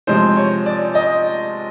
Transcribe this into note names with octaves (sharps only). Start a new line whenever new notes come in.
C3 F3 G#3 C5
C#5
D5
D#5